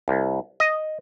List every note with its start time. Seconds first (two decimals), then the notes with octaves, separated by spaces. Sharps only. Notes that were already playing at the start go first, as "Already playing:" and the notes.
0.08 C2
0.60 D#5